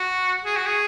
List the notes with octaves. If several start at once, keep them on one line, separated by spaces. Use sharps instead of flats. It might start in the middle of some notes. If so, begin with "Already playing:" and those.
Already playing: F#4
G#4
F#4
G#4